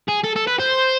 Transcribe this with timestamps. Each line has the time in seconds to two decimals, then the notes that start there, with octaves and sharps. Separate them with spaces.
0.08 G#4
0.24 A4
0.36 A4
0.47 B4
0.59 C5